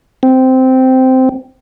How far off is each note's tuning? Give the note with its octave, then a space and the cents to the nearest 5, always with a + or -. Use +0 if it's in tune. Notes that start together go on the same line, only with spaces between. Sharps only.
C4 -10